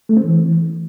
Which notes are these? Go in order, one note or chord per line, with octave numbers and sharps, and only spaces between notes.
A3
C4
E3